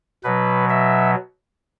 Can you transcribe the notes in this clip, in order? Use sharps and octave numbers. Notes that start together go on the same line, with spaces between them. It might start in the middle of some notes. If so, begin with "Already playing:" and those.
B2 F#3 B4
E5